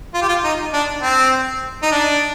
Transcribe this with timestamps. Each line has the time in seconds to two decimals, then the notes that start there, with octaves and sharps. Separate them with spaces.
0.14 F4
0.22 G4
0.29 F4
0.44 D#4
0.73 D4
1.03 C4
1.83 D#4
1.92 D4